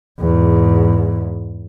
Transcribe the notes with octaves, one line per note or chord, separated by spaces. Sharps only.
E2 G#2